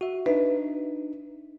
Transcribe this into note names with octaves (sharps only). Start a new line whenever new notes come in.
F#4 E5
D4 D#4 B4 E5